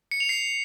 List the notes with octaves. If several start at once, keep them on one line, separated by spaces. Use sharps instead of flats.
C#7
F7
C7